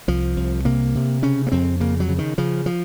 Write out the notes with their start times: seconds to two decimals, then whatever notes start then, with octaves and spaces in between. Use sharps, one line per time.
0.08 C2 F3
0.37 C2
0.65 C3 A#3
0.95 C3
1.22 C#3 C#4
1.47 A#3
1.52 F2 C4
1.80 C#3 A#3
2.00 F#3
2.09 C#3
2.19 D#3
2.38 C#3 F3
2.66 F3